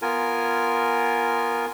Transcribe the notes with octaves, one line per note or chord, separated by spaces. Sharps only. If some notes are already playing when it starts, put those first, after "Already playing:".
B3 F4 A#4 G#5